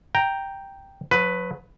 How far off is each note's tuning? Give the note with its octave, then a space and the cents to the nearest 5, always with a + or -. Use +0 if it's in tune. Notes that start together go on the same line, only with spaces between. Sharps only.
G5 +0 A#5 +0
F#3 -35 B4 +10